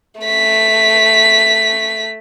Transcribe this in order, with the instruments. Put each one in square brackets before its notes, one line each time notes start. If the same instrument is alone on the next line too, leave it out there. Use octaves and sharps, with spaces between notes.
[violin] A3 B6